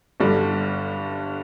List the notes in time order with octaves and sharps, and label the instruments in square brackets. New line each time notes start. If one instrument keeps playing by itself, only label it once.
[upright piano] G1 G2 D3 G3